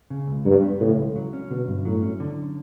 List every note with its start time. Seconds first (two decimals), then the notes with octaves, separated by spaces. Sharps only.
0.10 C#3
0.27 C#2
0.46 G2 F#3
0.62 B3
0.80 A2 C#3
0.98 C#2
1.16 F#3
1.33 C#4
1.51 B2 D3
1.68 G2
1.85 A2 F#3
2.02 C#4
2.20 D3